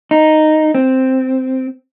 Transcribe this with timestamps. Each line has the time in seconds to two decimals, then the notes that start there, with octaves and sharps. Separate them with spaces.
0.11 D#4
0.75 C4